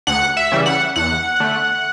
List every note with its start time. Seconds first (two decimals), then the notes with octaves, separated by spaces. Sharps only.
0.07 D2 F#5
0.37 E5
0.52 C#3 E3 G3
0.66 F#5
0.96 E2 F#5
1.40 D3 A3